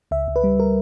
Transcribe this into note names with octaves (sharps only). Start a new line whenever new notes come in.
C#2 E5
C#2
B4
G3
A#4